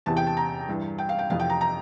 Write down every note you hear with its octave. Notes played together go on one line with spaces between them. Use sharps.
E2 C3 E3 A5
G5
A5
A#5
G2 E3
G5
F5
G5
F2 C3 E3 F5
G5
A#5
A#5